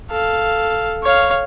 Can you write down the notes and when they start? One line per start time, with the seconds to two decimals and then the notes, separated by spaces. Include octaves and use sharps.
0.10 A4 F5
1.03 C#5 F5